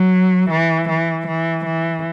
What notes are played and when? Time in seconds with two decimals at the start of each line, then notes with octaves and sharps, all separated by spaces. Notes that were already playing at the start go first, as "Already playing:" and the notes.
Already playing: F#3
0.50 E3
0.89 E3
1.27 E3
1.65 E3